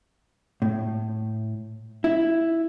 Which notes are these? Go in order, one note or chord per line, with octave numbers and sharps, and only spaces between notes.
A2
E4